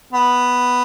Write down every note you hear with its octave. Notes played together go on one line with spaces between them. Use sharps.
B3